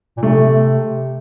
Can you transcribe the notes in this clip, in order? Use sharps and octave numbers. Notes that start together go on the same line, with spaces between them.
A#2
C3 A3
C3